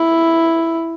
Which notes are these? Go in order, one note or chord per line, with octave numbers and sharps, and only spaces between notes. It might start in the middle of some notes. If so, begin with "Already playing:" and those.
Already playing: E4